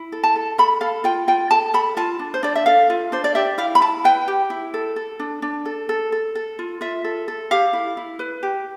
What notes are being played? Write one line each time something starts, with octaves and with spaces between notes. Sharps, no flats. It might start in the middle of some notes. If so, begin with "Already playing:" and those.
Already playing: E4
A4
A5
A4
A4 B5
A4 F5
F4 G5
F4 G5
A4 A5
A4 B5
F4 A5
D4
C5
D4 D5
E5
A4 F5
F4
D4 C5
D5
G4 E5
E4 F5
B5
E4 A5
B4 G5
G4
E4
A4
A4
D4
D4
A4
A4
A4
A4
F4
F4 E5
A4
A4
G4 F5
E4
E4
B4
G4